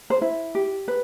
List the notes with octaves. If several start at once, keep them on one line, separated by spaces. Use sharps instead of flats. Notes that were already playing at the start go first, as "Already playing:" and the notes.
C5
E4
G4
B4